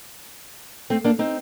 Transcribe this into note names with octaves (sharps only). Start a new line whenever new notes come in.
A3 C4
A#3 D4
C4 D#4